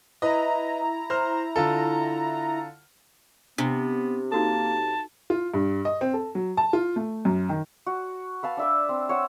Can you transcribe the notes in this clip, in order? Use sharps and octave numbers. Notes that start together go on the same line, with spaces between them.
E4 B4 D#5 A#5
C5 F6
D3 F4 A4
C3 B3 D4
A#3 D#4 F#4 A4 A5
F4
G2
D#5
C4
A4
F#3
A5
F4
A3
F#2
D#3
F#4
B4 F5 A5
D4 E5 D6
C4
C#5 F#5 E6